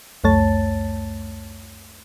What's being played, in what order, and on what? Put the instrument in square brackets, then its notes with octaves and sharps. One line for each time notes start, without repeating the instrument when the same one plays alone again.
[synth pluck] C#2 F#2 A3 C#5 A5 A6